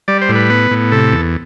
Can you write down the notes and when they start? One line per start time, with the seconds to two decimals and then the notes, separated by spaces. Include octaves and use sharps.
0.08 G3 D5
0.22 C5
0.29 A2
0.35 B4
0.50 B3
0.71 A2
0.92 C3 A4
1.12 E2